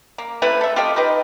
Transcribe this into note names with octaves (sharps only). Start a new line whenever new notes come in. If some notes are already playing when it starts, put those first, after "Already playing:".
A#3
C3 A3 E4 B4
A4 E5
F4 G4 A4 D#5
D#4 G4 B4 D#5